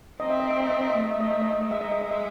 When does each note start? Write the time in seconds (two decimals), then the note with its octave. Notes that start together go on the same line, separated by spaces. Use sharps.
0.20 C4 D#5
0.30 E5
0.40 D#5
0.50 E5
0.60 D#5
0.70 E5
0.81 D#5
0.90 A3 E5
1.01 D#5
1.11 E5
1.20 D#5
1.31 E5
1.42 D#5
1.51 E5
1.61 D#5
1.69 G#3 E5
1.81 D#5
1.91 E5
2.01 D#5
2.11 E5